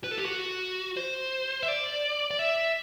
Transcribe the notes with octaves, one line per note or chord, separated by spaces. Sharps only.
B4
A4
G4
F#4
C5
E5
D5
D5
E5